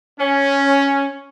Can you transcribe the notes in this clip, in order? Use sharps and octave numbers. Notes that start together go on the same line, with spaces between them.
C#4